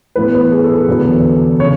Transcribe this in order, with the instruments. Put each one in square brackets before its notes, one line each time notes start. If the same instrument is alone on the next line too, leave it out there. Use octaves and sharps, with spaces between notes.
[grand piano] A2 E3 B3 B4
B4
G#4
A4
A4
E2 D3 F#3 B3
C#3 C#5